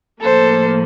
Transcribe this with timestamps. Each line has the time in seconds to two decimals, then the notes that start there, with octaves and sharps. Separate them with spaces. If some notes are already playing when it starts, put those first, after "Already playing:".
0.22 A2 F3 A#3 A4 C5